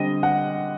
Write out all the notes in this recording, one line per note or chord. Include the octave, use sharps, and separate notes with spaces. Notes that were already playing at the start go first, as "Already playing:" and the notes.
Already playing: D3 G3 C4 D#5
F#5